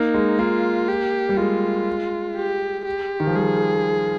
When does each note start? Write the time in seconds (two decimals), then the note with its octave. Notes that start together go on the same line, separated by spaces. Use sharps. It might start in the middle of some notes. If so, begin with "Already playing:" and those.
Already playing: A#3 D#4
0.14 G#3
0.39 A#3 F4
0.88 G4
1.29 G3
1.38 G#3 F4
2.36 G4
2.86 G4
3.20 D#3
3.27 F3
3.35 G3 G#4